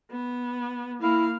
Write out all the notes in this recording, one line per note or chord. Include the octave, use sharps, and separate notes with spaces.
B3
A#3 E4 F5